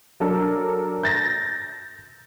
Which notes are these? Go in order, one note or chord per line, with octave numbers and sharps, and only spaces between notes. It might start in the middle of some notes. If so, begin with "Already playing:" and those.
F#3 D4 A4 A#4
G6 A6 A#6